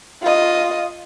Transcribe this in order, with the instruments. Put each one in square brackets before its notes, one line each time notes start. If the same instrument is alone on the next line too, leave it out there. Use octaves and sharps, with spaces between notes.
[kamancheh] F4 D#5